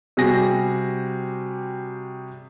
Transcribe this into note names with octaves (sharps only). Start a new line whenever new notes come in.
C3 G3 F#4 G#4 A#6